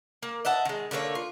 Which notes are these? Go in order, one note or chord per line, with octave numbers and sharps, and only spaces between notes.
A#3
D#5 E5 F#5 A5
D#3 G#3
D3 A3 A#3 C#5
F4